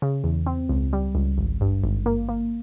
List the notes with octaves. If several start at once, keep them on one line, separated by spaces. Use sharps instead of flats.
C#3
E2
C4
C#2
G3
C#2
G#1
G2
G#1
A#3
A#3